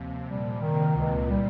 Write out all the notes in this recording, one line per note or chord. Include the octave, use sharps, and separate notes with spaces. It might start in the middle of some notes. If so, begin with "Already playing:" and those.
Already playing: D#2 C3 F3
A#2 G3
C3 D#3
C#2 C3
G3